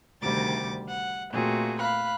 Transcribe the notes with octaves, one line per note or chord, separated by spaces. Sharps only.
D2 C3 D#3 G3 D6 A6
F#5
A#2 A3 C4 F#4 G#4
F5 B5 F#6